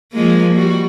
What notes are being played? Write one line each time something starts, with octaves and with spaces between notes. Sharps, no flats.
F3 G#3 A#3
G3 F#4